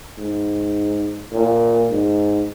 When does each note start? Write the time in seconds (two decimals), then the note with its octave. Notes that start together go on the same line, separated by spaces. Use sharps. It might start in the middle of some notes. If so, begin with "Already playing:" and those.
0.18 G#2
1.32 A#2
1.90 G#2